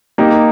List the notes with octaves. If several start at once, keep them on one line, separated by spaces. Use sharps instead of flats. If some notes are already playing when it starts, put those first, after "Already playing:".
A#3 D#4 G4